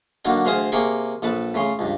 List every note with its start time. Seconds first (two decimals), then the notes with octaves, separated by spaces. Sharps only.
0.25 D3 F#3 A#3 D4 D#4
0.45 D2 G#4 C5 F5 D#6
0.72 C3 A#3 G#4 G5 C#6
1.22 A#1 A4 B4 A5
1.54 A2 C#3 C6
1.79 C#2 G2